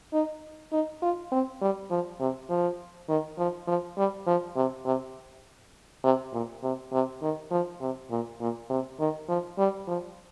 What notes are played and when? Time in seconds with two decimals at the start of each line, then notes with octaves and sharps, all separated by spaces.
0.13 D#4
0.72 D#4
1.02 F4
1.32 C4
1.61 G3
1.90 F3
2.20 C3
2.50 F3
3.09 D#3
3.38 F3
3.68 F3
3.98 G3
4.27 F3
4.56 C3
4.86 C3
6.04 C3
6.33 A#2
6.63 C3
6.93 C3
7.22 D#3
7.51 F3
7.81 C3
8.10 A#2
8.40 A#2
8.70 C3
8.99 D#3
9.29 F3
9.58 G3
9.88 F3